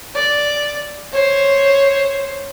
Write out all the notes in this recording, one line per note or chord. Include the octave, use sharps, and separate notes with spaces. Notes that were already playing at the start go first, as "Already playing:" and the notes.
D5
C5 C#5